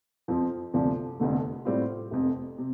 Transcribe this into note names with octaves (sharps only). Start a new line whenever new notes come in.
F2 F3 C4 F4
D2 C3 F3 D4
F1 F2 D3 A3
A2 G3 C4 F4
F1 F2 C3
C3